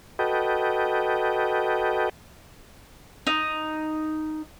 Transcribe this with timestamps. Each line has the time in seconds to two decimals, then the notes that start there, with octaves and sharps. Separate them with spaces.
0.19 F#4 A4 B4 D#5 G5
3.27 D#4